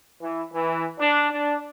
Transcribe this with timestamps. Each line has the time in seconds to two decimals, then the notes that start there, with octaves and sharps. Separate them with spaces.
0.22 E3
0.53 E3
1.00 D4
1.33 D4